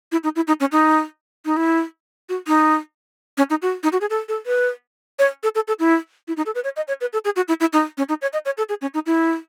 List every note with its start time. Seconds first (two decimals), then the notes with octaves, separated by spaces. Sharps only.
0.12 E4
0.24 D#4
0.36 E4
0.47 D#4
0.60 C#4
0.72 D#4
1.45 D#4
1.57 E4
2.29 F#4
2.47 D#4
3.38 C#4
3.50 D#4
3.62 F#4
3.83 D#4
3.92 F#4
4.01 G#4
4.10 A4
4.29 A4
4.46 B4
5.19 C#5
5.43 A4
5.55 A4
5.68 A4
5.79 E4
6.28 E4
6.37 D#4
6.46 A4
6.55 B4
6.64 C#5
6.76 D#5
6.88 C#5
7.01 B4
7.13 A4
7.25 G#4
7.36 F#4
7.48 E4
7.60 E4
7.73 D#4
7.98 C#4
8.09 D#4
8.22 C#5
8.33 D#5
8.46 C#5
8.58 A4
8.69 G#4
8.82 C#4
8.94 D#4
9.06 E4